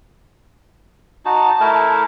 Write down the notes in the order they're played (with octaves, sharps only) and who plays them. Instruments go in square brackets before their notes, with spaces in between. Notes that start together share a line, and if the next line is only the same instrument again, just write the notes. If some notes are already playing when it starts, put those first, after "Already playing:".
[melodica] D#4 F#4 [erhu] A5
[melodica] A3 E4 A#4